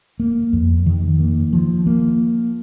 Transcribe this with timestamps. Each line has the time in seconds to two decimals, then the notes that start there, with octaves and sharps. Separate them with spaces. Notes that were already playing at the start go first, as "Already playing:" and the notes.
0.20 A#3
0.53 F2
0.86 D#3
1.20 A#3
1.53 F3
1.87 A#3